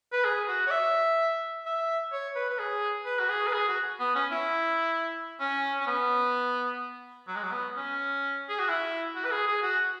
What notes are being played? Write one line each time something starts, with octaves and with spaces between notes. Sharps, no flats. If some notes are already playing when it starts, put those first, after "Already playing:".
B4
G#4
F#4
C#5
E5
E5
C#5
B4
B4
G#4
B4
F#4
G#4
B4
G#4
F#4
B3
C#4
E4
C#4
C#4
B3
F#3
G#3
F#3
B3
C#4
G#4
F#4
E4
F#4
B4
G#4
G#4
F#4